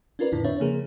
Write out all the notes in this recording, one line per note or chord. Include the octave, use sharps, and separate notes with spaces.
C#4 D4 F4 A#4 B4 D5
F2 A2 D3 E4
C4 D4 B4 C#5 E5
C#3 F3 A#3 G#4 A#4